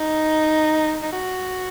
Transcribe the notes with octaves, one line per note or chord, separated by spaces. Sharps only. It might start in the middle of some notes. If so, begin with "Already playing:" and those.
Already playing: D#4
D#4
F#4